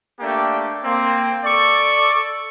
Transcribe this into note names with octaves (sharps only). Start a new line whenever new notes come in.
A3 A#3 D4 G4
A#3 C4
A4 D5 C#6